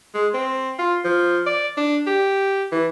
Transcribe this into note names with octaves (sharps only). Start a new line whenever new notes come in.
G#3
C4
F4
F3
D5
D4
G4
E3